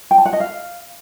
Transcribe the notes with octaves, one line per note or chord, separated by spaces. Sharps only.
G5
A5
F#5
D#5
F5